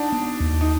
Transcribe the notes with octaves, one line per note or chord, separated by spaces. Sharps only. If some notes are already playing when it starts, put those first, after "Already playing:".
Already playing: D4 D#4 F#4
B3
D#2
D#4